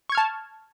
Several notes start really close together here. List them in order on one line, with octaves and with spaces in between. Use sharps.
C#6 G#6 F6 A5